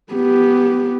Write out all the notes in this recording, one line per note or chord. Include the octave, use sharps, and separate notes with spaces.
B3 G4